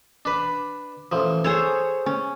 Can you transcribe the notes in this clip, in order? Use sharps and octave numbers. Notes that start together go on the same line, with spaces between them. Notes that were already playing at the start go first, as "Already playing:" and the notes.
D4 B4
A1 F3
G#4 A4 C5 C#5
C#4